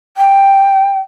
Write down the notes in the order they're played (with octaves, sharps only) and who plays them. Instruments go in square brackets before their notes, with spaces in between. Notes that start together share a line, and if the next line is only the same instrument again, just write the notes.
[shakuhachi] G5